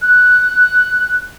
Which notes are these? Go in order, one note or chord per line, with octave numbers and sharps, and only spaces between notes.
F#6